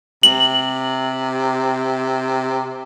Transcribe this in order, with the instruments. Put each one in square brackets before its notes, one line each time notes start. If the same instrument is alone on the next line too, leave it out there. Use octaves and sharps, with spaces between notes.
[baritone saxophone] C3 [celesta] F#7